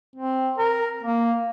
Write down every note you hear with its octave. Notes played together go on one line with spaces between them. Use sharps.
C4
A#4
A#3